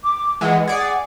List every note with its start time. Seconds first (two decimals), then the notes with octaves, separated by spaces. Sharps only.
0.03 D6
0.41 E3 G#3 F#5
0.67 G#4 D5